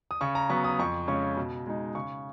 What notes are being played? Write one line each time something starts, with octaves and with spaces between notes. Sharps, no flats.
D#6
C#3 C#6
A#5
F#3 B3 C#6
D#6
F2 C#6
C#3 G#3 C#4 C#6
B2
G#3 D#4
C#3 C#6